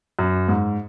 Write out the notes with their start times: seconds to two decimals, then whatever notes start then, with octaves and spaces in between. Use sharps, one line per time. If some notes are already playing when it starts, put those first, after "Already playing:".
0.19 F#2
0.48 G#2